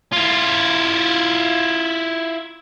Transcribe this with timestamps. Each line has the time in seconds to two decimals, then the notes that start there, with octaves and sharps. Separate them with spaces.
0.12 E4 F4